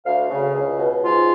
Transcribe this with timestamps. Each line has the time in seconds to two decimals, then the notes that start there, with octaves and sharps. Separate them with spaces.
0.05 D2 F5
0.30 C#3
0.54 C#2
0.78 B2
1.03 G#2 F4